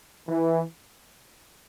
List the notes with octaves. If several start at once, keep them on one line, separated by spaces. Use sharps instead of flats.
E3